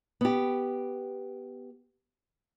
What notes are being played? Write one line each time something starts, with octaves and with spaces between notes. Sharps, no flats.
B3 G4